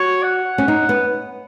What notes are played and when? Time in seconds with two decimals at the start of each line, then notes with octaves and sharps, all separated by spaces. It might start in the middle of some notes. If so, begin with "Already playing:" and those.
Already playing: F#4 C#5
0.23 F#5
0.58 C#4
0.68 D#4
0.89 B3